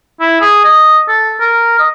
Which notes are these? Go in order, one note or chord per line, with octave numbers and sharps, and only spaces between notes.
E4
G#4
D#5
A4
A#4
D#5